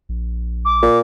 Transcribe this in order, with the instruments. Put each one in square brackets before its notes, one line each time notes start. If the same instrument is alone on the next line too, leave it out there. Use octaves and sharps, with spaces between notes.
[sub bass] A#1
[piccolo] D6
[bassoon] A#2